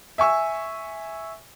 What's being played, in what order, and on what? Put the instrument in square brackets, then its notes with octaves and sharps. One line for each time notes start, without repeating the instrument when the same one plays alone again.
[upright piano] E5 G#5 C#6 E6